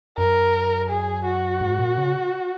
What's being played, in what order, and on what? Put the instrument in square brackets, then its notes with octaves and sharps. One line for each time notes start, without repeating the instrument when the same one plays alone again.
[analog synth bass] F#2 [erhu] A#4
[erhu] G#4
F#4
[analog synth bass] G#2
A#2
C#3